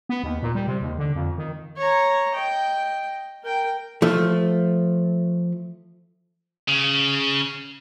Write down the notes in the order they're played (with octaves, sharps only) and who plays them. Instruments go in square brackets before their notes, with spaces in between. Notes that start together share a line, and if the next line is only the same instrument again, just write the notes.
[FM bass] B3
D#2
A#2
G3
C3
D#2
D3
F2
D#3
[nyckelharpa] C#5 A#5
D#5 G5
A#4 G5
[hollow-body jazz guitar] F3 A3
[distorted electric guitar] C#3